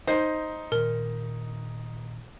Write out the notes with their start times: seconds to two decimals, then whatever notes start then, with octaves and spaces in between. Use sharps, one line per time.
0.07 D#4 C5
0.72 A#2 D#3 A#4